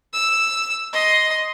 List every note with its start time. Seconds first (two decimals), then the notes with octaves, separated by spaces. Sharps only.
0.13 E6
0.93 D#5 C6